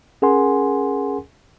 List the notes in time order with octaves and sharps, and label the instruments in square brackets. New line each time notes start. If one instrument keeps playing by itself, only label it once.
[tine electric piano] C#4 G#4 A#4 F#5 G#5 C6